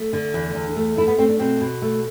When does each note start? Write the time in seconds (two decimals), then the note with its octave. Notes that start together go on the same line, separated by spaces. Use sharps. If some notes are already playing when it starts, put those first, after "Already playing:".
Already playing: A3
0.13 D3
0.34 E2
0.55 E2
0.77 A3
0.97 A3 E4
1.07 B3
1.18 A3 C4
1.29 D4
1.39 B2 C4
1.61 B2
1.82 A3